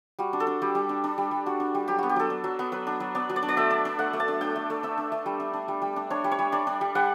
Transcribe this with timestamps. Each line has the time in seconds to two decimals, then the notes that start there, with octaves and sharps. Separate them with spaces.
0.19 G3 F#4
0.33 D4
0.40 A4
0.47 D4
0.62 G3 G4
0.75 G3
0.89 D4
1.04 D4
1.18 G3
1.31 G3
1.46 D4 F#4
1.60 D4
1.75 G3
1.88 F#3 G4
1.98 B3 F#4
2.09 G4
2.16 F#3 A4
2.30 D4
2.44 F#3
2.59 B3
2.72 F#3 B4
2.87 D4
3.00 F#3
3.15 B3 D5
3.29 F#3
3.36 D5
3.43 D4
3.49 D5
3.57 A3 E5
3.70 D4
3.85 D4
3.99 A3 F#5
4.13 A3
4.20 A5
4.28 D4
4.41 D4 G5
4.56 A3
4.70 A3
4.83 D4 E5
4.98 D4
5.12 A3
5.26 G3
5.40 D4
5.53 D4
5.68 G3
5.82 G3
5.96 D4
6.10 D4 C#5
6.24 G3
6.31 C#5
6.39 G3
6.52 D4 D5
6.67 D4
6.81 G3
6.95 G3 F#5